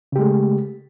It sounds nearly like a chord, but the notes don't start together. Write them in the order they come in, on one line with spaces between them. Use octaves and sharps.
C#3 G4 G#3 A3